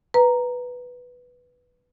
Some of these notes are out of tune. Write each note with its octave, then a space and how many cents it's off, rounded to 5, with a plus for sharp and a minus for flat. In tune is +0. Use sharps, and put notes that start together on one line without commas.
B4 +0 A#5 +0